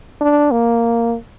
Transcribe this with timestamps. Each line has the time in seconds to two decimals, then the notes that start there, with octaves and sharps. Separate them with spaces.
0.21 D4
0.51 A#3